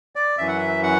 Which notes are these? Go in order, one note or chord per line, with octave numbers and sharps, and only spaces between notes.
D5
F#2 E3 E5
F#5
E5
F#5